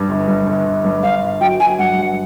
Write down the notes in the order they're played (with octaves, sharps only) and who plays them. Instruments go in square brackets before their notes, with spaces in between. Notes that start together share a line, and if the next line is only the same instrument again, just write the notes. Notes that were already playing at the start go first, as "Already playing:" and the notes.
Already playing: [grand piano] G2
G1
G2
G1
G1
G2
[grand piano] G2 [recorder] F5
[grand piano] G1
[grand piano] F#3 [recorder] G5
[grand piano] F#3 [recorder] G#5
[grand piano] G2 [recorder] F#5
[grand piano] G2